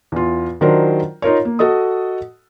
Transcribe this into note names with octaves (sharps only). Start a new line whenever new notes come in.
E2 F4
D#3 F#3 D4 F4 A#4 C5
D#4 F4 A#4 C#5
A#3
F#4 A4 D#5 D#6